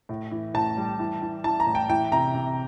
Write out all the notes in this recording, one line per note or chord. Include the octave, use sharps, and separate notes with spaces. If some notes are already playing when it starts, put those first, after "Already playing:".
A2
E3
A2 A5
G3
E3
E3
E3 A5
A#5
A2
G5
E3 G5
C3 A#5
C3